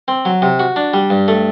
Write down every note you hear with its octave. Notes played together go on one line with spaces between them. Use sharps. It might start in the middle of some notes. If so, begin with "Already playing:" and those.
C4
F#3
C3
F#4
D4
G3
G2
A3